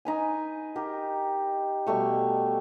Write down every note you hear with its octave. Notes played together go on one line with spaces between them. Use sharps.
D#4 B4 G#5
G4 A#4
B2 G3 A3 C#6